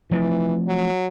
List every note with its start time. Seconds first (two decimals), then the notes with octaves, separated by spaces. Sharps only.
0.11 E3 F3 A3 C4
0.68 F#3